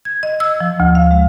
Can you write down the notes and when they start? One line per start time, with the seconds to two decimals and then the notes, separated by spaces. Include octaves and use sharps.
0.05 G#6
0.23 D#5
0.40 E6
0.60 F3
0.80 D2
0.95 F5
1.11 G#3